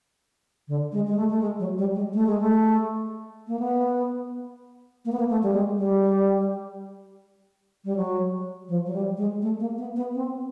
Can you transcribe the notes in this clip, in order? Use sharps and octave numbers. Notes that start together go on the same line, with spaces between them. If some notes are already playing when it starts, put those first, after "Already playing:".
D3
G#3
G#3
A3
A3
G#3
F#3
G3
G#3
A3
G#3
A3
A#3
B3
A#3
B3
A#3
A3
G3
G#3
G3
G3
F#3
F3
F#3
G3
G#3
A3
A#3
B3
B3
C4